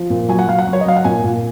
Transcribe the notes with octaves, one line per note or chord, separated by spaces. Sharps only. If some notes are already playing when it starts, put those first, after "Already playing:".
Already playing: F3
A#2
F#3 G#5
F#5
F#3 F5
F#5
F#3
C#5
D#5
F#3 F5
F#5
A#2 G#5
A#2